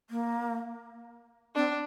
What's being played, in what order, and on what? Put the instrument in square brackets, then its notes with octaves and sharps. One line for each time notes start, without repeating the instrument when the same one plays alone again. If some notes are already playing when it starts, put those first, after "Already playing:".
[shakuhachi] A#3
[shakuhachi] C4 [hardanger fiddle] D4